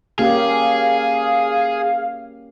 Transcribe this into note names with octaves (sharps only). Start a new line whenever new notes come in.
A#3 C#4 G4 G#4 F5